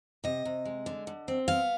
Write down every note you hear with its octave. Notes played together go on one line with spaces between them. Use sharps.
C3 D#5
C3
G#3
D3
D3
C4
B3 F5